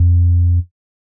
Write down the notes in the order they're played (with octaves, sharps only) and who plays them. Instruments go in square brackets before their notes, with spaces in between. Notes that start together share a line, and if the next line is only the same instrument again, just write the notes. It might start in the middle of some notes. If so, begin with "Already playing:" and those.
Already playing: [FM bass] F2